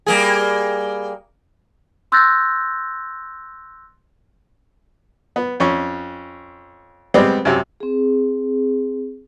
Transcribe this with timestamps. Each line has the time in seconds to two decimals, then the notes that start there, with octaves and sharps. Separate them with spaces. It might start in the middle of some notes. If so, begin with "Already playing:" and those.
0.06 G3 A#3 G#4
2.12 C6 E6 F#6 G6 A6 A#6
5.36 B3
5.60 F2 C#4 C#6
7.14 G3 G#3 B3 C4 D5
7.45 F#2 C3
7.80 C4 G#4